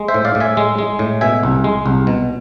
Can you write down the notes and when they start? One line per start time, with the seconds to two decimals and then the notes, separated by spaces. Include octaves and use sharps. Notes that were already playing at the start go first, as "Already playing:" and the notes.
Already playing: G#3
0.08 C5 E5
0.14 A2
0.25 D5 F5
0.35 A2
0.40 E5 G#5
0.57 G#3
0.78 G#3
0.99 A2
1.21 B2 E5 G#5
1.43 C2
1.64 G#3
1.86 C2
2.07 B2